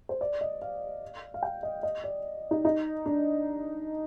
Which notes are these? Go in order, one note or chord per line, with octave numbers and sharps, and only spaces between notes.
C5
D5
D#5
F5
F5
G5
D#5
D#5
D5
D#4
D#4
D4